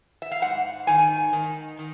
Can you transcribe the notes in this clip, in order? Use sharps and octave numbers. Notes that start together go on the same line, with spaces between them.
E5
F5
G#2 F#5
D#3 G#5
D#3
D#3